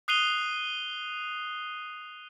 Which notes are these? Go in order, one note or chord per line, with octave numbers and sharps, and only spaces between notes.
D#6 F#6 C7 D#7 F7 G7